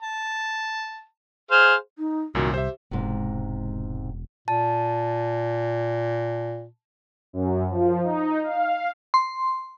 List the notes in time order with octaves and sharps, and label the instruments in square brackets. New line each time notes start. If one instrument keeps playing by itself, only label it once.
[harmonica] A5
G#4 C5 F5
[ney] D#4
[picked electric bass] C2 [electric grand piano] F#2 A#2 D#3 [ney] F#4
[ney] G4 [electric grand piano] C5 E5
[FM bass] E1 [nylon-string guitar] G#2 C3
[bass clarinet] A#2 [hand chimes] A5
[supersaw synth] F#2
F3
D#4
F5
[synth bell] C6